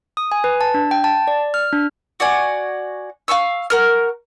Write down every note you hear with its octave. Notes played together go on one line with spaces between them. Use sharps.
D#6
G#5
B4
A5
D4
G5
A5
D5
F6
D4
F#4 D5 G#5
F5 A5 C#6 E6
F#4 A#4 F6